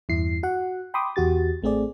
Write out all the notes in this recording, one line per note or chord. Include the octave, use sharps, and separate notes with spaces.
E2 G2 E4 C7
F#4 F#5
G5 B5 C6 D6 D#6
E2 F#4 G4 A6
A1 A3 C4 G#4 D5